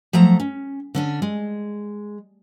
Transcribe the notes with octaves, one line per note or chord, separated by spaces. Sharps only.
F3 F#3 A3 A#5
C#4
D3 C#4 D4
G#3